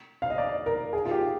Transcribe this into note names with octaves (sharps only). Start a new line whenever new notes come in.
F5
D#5
D5
A#4
G#4
F4
G4